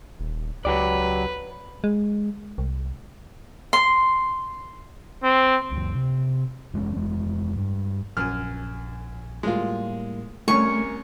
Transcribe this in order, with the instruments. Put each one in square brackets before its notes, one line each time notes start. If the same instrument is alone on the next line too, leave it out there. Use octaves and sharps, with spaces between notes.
[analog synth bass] D#1
[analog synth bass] C#2 [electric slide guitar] F#3 G4 D5 [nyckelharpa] B4
[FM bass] G#3
C2
[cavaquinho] C6
[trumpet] C4
[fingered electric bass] C#2 F#2
C3
F1 G#3 C#4
F1 G#3
G2
[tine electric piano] A#1 G#5 [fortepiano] F#2 F6
[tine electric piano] A2 G3 A#3 [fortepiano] G#3 F4
[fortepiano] C2 C#4 [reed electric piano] A3 [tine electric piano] A#4 G#5 [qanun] C#6